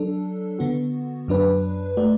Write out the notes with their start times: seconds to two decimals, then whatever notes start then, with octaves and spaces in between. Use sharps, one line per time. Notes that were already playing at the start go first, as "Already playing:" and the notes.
Already playing: F#3 D4 A4
0.59 D3 B3 F#4
1.28 F#2 F#3 D4 B4
1.97 A3 F#4 D5